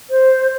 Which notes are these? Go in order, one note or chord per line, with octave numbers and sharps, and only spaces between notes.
C5